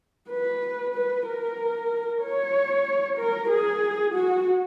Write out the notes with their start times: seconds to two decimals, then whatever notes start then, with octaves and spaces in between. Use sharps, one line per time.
0.30 B4
0.95 B4
1.27 A#4
2.22 C#5
3.18 A#4
3.50 G#4
4.15 F#4